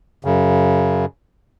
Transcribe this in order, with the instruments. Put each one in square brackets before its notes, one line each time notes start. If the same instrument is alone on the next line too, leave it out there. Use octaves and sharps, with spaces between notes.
[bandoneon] F#2 C#3